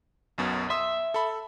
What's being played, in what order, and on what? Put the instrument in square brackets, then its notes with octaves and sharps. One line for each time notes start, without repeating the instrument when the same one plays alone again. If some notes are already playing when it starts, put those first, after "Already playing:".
[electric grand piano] B1 F#2 B2
[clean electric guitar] E5 [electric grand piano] C6 D#6 E6
[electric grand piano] A4 B5